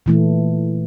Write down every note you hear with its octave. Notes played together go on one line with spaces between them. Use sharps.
A#2 E3 A3